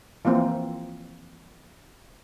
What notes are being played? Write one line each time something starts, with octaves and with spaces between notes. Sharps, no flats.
E3 F3 A#3 C4